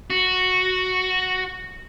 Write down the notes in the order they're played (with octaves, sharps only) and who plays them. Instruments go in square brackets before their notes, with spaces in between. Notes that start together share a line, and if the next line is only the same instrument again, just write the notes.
[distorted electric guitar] F#4